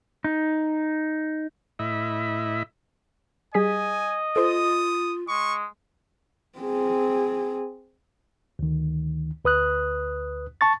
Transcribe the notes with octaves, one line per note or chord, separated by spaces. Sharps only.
D#4
A2 E4 D#5 E5 B5
G3 G#4 D#5 G#5 B6
F4 A4 C5 D#6
G#3 C#6
C4 G#4
D2 D#3
D2 B4 D#6 F#6
A5 C#6 A6